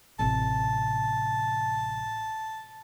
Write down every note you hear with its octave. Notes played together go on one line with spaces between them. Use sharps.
A1 C3 A5